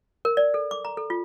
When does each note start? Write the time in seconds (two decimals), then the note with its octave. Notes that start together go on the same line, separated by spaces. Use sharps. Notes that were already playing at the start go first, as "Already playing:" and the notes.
0.25 A#4
0.37 D5
0.54 A4
0.71 D6
0.85 A#5
0.97 A4
1.10 F4